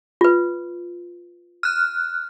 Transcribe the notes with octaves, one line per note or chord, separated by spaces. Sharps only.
F4 B4
F6 F#6